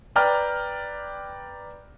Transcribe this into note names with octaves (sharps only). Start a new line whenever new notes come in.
B4 D5 G5 A#5 F6